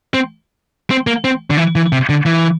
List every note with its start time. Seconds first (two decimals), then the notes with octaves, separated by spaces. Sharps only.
0.14 C4
0.91 C4
1.07 A#3
1.24 C4
1.50 D3
1.57 E3
1.76 E3
1.92 C3
2.09 D3
2.26 E3